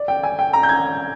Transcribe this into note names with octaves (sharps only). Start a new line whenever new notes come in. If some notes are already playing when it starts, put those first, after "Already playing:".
Already playing: D5
G5
G#5
G5
A#5
G6
G#6